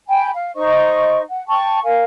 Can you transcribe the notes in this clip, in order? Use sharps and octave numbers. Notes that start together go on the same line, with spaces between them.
G5 G#5 B5
F5
D#4 C5 D#5 C#6
F#5
G5 A5 C#6
A#4 F5 G#5